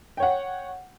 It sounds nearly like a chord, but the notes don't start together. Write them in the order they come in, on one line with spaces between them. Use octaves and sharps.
G5 C#5 F#5